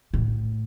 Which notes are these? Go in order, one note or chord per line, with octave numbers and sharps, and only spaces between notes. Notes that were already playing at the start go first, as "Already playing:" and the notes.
A2